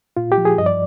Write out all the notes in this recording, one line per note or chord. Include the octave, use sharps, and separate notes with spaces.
A#2 F4
G4
F3
G#4
G2 D#5
D5